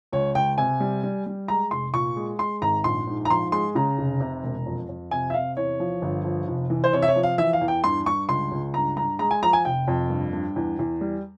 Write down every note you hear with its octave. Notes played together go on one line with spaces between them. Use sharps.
C#2 C#5
C#2 G5
C3 G#5
G3
G3
G3
G#3 A#5
F1 C6
A#2 C#6
G#3
G#3 C6
G#1 A#5
A#1 C6
G#2
A#5
F3 C6
G#3 C6
C#3 A#5
F1
C3
E1
F2
F2
C3 G#5
E5
C3 F5
E2 C#5
F3
G1
F3
F1
E3
C5
C3 C#5
E5
C#5
F3
F5
E3 E5
F5
E2
G5
G2 C6
G2 C#6
C#2 C6
C#2
G2 A#5
G2 A#5
G#3 A#5
G#5
F3 A#5
G#5
F1 G5
F2
G2
G2
E2
E2
G3